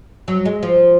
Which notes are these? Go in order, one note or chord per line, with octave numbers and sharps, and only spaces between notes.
F#3
G#3
F3